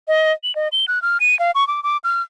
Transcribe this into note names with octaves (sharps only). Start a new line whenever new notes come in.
D#5
F#7
D#5
G7
F#6
F6
D#7
F5
C#6
D6
D6
F6